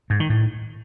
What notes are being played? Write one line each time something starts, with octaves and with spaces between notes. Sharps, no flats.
G#2
D#3
A2